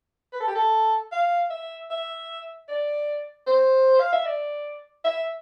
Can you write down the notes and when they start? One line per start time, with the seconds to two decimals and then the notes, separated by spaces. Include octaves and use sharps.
0.33 B4
0.41 A4
0.48 G4
0.55 A4
1.12 F5
1.50 E5
1.91 E5
2.69 D5
3.47 C5
4.00 F5
4.13 E5
4.26 D5
5.05 E5